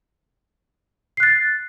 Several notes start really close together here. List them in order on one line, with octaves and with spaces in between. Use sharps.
C7 F#6 A6